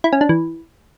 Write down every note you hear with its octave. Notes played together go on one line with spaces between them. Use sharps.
E4
C#4
D4
E3